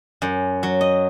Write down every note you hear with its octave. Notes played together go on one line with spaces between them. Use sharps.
F#2
F#3
D#5